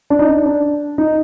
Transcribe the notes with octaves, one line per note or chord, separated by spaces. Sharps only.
D4
D#4
D4
D4
D#4